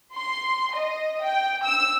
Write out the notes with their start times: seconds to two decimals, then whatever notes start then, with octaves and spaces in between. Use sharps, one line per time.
0.15 C6
0.75 D#5
1.23 G5
1.64 E6